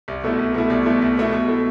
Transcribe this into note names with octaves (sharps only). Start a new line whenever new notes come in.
C2
B2 A3 E4
C2
B2 A3 E4
C2
B2 A3 E4
C2
B2 A3 E4
B2
A3 E4